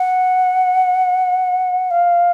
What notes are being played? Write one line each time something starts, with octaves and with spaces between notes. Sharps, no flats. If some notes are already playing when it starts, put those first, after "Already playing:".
Already playing: F#5
F5